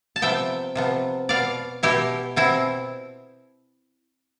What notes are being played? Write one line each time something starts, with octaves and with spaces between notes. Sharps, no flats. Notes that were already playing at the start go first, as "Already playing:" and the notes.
A5
C3 F3 B3 E5 G5
C3 F3 B3
B2 B3 D5 F5
B2 B3 E4 G4
B2 B3 C4 E4